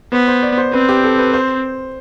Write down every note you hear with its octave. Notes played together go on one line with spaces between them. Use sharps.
B3 C5
C5
D5
C5
C4 B4
G4
A4
B4
C5